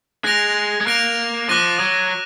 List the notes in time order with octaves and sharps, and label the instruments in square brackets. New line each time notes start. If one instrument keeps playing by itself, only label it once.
[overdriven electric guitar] G#3 [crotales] F#6 A#6 D7 F7
[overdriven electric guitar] G#3
[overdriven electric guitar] A#3 [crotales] F#6 A#6 D7 F7
[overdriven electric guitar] F3 [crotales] D6 F#6 A#6 D#7
[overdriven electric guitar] F#3